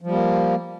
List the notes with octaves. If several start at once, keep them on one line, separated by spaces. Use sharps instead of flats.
F3 G3 A#3